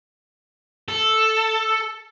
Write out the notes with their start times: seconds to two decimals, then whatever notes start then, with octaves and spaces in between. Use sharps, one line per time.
0.89 A4